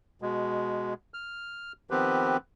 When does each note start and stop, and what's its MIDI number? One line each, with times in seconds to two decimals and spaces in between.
0.22 0.94 47
0.22 0.94 56
1.14 1.72 89
1.90 2.37 51
1.90 2.37 53
1.90 2.37 59
1.90 2.37 60
1.90 2.37 67
1.90 2.37 71